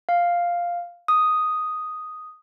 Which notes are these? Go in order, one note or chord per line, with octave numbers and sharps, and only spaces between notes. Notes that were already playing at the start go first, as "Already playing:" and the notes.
F5
D#6